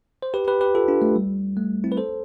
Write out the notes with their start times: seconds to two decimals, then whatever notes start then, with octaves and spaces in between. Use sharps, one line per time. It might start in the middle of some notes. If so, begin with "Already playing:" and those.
0.22 C5
0.34 G4 B4
0.47 G4 B4
0.61 G4 B4
0.75 F4 A4
0.88 D4 F4
1.02 A3
1.16 G3
1.57 A3
1.84 C4 E4
1.92 B4
1.97 A4 C5